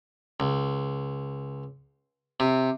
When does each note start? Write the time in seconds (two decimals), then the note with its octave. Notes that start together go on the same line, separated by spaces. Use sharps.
0.40 C#2
2.40 C3